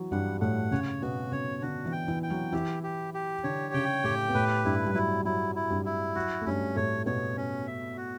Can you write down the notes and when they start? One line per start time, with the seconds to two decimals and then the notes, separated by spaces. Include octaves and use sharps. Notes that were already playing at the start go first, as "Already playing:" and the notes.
Already playing: E3 F#3
0.11 G2 G3 F#5
0.41 A2 A3 F#5
0.71 C#3 C#4 C#5
1.02 B2 B3 F#4
1.31 C#3 C#4 C#5
1.62 D3 D4 F#4
1.85 E3 E4
1.92 G5
2.08 E3 E4
2.23 G5
2.30 F#3 F#4
2.52 E3 E4 G4
2.83 G4
3.14 G4
3.44 D3 D4 C#5
3.74 C#3 C#4 G5
4.04 A2 A3 G4
4.29 B3
4.34 A2 A3 B4
4.65 G2 G3 E4
4.86 G3
4.94 F#3 E4
5.25 F#3 E4
5.55 E4
5.70 G2 G3
5.85 E4
6.15 F#3 F#4
6.42 A3
6.46 G2 G3 C#4
6.76 A2 A3 C#5
7.06 B2 B3 C#5
7.37 C#4
7.67 E5
7.97 F#4